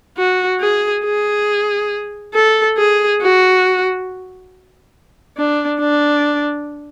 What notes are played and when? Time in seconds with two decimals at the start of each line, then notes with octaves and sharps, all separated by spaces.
0.18 F#4
0.60 G#4
1.04 G#4
2.34 A4
2.78 G#4
3.21 F#4
5.37 D4
5.80 D4